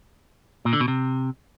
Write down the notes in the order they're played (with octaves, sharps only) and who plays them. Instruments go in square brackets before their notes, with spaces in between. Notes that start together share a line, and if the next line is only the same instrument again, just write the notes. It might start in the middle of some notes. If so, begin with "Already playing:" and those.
[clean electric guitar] A#2
D3
B2
C3